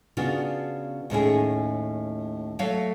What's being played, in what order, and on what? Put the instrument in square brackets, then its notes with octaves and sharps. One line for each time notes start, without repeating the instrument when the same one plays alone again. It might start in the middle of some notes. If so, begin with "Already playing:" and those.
[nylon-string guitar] C#3 B3 D4 F4 F#4
D#2 A2 C#4 G#4
F#3 A3 C#5 F5